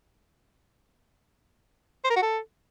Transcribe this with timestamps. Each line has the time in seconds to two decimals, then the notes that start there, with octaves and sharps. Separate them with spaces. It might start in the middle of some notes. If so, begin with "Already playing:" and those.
2.04 C5
2.10 A#4
2.16 F#4
2.22 A4